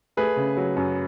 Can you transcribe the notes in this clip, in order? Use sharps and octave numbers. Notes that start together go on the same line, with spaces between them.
A3 G#4 B4
C#3
F#3
F#2